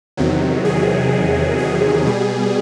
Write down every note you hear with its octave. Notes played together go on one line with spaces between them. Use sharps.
E2 C3 D#3 F#3
G#4
G#4
B2 G3